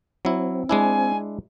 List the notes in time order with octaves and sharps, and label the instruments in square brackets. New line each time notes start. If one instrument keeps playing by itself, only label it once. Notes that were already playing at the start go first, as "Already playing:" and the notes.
[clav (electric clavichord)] F#3 E4 [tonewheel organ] C4
[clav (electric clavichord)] G#3 D4 E4 [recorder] G#5